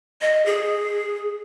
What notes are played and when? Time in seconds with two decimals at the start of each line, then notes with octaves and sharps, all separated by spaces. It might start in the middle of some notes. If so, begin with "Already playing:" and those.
0.21 D#5
0.46 G#4